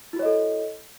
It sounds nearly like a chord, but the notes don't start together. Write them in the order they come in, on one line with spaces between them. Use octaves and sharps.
E4 F#4 C#5 D#5 A4